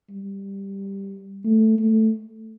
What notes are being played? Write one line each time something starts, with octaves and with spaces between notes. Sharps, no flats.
G3
A3
A3